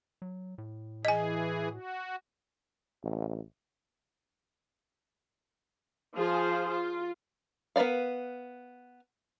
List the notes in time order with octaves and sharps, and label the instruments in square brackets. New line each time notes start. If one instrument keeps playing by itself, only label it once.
[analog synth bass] F#3
A2
[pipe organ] E3 G#4 [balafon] D#5 G#5
[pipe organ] F#4
[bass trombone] A1
[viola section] F3 F4 G#4 C5
F4
[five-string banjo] B3 A#4 B4 D5 F5